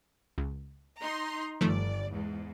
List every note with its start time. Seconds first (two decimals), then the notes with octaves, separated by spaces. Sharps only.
0.38 C#2
1.00 D#4 A#5 C6
1.61 G1 D#3 F3 A3 D5
2.11 E2 G#2